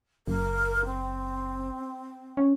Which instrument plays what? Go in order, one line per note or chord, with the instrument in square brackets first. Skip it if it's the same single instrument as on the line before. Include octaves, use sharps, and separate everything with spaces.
[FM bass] F#1 [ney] A#4
[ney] C4
[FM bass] C#4